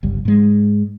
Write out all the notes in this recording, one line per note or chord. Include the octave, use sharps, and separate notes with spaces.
G1 C#2 G3
G#2 G#3